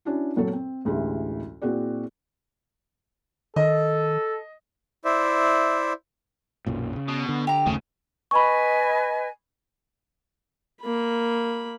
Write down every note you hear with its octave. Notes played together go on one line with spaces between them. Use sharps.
C#4 D4 E4 F#4
A#2 F#3 C4 A4
C4
A1 D2 E3 G#3 G4
A#2 C4 E4 F#4 G#4 D5
D#3 A4 D#5
E4 C5 D5 E5
B1 F#2 A#2
C#3
B2
D3
G4 A#5
F#1 D#2 C#3 A3
B4 D#5 G#5 B5 C#6
A#3 B5